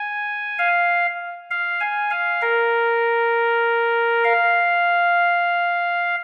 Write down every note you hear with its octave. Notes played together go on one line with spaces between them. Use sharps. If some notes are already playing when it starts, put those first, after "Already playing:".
Already playing: G#5
F5
F5
G#5
F5
A#4
F5